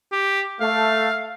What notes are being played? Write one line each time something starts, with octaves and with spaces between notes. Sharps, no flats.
G4
A3 F5